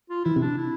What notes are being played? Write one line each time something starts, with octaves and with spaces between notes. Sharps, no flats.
F4
E3 E4
C3
D4
E4